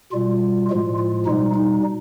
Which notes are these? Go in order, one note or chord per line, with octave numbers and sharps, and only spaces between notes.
B2 G3 F4
A2 F3 G#3 F4
F4
B2 G3 D#4
D#4